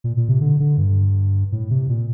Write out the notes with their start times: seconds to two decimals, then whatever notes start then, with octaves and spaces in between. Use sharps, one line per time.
0.04 A#2
0.17 A#2
0.29 C3
0.41 D3
0.60 D3
0.78 G2
1.52 A2
1.70 C3
1.89 A#2